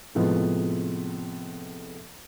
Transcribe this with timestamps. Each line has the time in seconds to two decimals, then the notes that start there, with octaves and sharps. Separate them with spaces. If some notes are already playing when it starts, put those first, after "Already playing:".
0.15 A2 C3 F3 G#3 B3